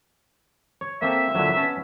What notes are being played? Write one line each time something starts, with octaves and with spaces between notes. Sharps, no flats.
C#5
A#3 C4 A4 E5
A#2 D3 F#3
B3 C#4 A5